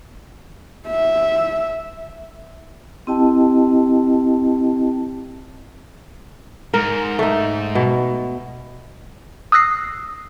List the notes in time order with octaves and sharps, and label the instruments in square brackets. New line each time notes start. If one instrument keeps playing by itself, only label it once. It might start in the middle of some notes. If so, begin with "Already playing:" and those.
[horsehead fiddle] E5
[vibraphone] C4 E4 G4 D#5 G5 A5
[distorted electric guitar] G#2 [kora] A#4
[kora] A3 D#4
B2
[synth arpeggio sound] D#6 E6 F#6 A#6 C7